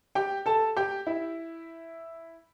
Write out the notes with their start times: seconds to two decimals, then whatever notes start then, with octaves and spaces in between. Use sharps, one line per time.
0.15 G4 G5
0.46 A4 A5
0.77 G4 G5
1.07 E4 E5